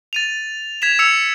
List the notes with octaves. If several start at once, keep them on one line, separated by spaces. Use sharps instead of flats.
A6 D#7 F7
G#6 B6 E7 F7
E6 C#7 F7